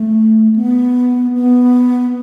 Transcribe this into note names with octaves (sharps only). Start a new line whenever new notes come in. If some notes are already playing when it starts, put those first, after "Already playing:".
Already playing: A3
B3
B3